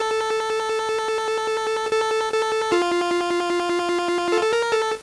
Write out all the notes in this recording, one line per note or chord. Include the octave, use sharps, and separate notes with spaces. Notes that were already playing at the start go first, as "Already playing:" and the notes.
Already playing: A4
A4
A4
F4
A4
A4
A#4
A4